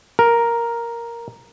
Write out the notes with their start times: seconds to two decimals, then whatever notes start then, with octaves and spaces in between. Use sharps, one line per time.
0.19 A#4